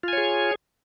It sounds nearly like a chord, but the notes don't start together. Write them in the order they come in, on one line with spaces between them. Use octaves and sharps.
F4 G#5 C#5 G#4